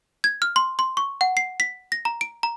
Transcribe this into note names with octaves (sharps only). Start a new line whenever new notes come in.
G#6
F6
C6
C6
C#6
F#5
C7
B6
A#6
A#5
D7
A#5